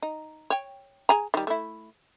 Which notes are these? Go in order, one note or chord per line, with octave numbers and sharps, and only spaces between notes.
D#4
C#5 G5
G#4 G#5 A#5
D#3 G3
A3 E4